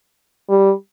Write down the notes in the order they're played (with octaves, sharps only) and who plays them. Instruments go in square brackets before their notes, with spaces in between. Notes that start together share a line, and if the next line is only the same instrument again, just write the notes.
[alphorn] G3